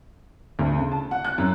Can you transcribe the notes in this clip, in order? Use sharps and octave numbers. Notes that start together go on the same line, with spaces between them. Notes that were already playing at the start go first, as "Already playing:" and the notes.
D2
C#3
A5
F#5
F#6
F#2